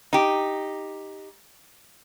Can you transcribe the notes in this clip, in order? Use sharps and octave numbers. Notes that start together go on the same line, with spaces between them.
D#4 G4